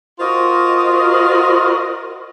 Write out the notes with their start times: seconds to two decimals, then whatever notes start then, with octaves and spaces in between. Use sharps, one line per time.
0.20 F4 F#4 A#4 C5 D#5